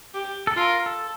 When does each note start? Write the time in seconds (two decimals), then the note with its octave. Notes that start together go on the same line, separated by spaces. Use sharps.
0.14 G4
0.47 A4
0.57 F4 A#4
0.86 A4